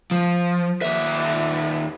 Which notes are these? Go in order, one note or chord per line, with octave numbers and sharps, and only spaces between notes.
F3
D#2 E5